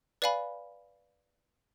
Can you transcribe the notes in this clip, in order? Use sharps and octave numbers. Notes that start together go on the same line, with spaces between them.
B4 D5 F5 G#5 B5